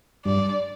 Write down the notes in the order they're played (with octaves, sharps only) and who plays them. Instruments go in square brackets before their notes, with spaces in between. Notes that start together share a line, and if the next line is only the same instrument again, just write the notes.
[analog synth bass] G2 [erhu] D5